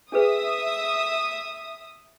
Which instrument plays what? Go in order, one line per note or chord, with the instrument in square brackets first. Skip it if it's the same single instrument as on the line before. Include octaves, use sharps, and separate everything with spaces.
[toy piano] D4 G#4 B4 [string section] E5 D#6